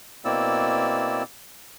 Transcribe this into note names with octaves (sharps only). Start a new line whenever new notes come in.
B2 A#3 C4 E4 D5 E6